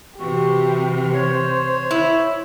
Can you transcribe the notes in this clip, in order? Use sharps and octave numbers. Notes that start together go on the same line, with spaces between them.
C3 E3 F#4 G4
C5 C#5
E4